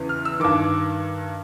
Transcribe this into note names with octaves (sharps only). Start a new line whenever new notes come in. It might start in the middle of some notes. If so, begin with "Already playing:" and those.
Already playing: E2 C#3 E3
F6
E6
G2 D#3 D6